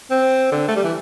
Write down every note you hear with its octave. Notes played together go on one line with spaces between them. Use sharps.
C4
D3
A3
G3
E3